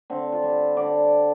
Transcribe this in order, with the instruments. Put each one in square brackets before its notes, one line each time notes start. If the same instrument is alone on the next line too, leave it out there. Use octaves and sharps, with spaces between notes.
[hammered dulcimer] D3 C4
F4
G3
D3 D5